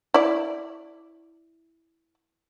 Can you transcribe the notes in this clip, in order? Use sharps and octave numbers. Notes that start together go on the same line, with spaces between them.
E4 D5